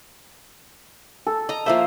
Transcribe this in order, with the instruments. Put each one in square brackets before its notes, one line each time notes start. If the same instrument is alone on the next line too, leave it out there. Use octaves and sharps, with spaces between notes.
[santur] A4
[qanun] D#5 A#5
[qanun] F3 A#3 C5 [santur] E5